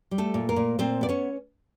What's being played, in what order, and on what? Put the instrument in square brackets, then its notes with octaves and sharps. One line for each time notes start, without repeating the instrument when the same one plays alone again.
[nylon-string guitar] G3
A3 A4
A#2
A#3 A#4
A#2
A#2 C4 C5
B3 D5
C#4 C#5